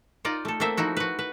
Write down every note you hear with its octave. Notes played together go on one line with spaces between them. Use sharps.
D#4 F4 D5 D#5
A3 A4
A3 A#3 C4 C5 E5
F3 D#4 E4 F#4
F#4 B4
B4